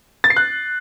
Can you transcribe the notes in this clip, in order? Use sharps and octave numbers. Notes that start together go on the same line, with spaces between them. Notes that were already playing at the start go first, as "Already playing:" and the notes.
A6
C7
F#6